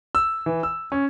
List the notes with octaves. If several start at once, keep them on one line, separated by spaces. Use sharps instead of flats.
E6
E3
E6
C#4